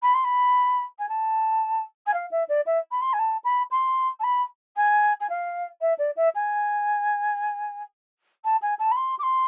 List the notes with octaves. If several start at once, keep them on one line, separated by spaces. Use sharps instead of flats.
B5
C6
B5
G#5
A5
G#5
F5
E5
D5
E5
B5
C6
G#5
A5
B5
C6
A5
B5
G#5
G#5
F5
E5
D5
E5
G#5
A5
G#5
A5
B5
C6
D6
C6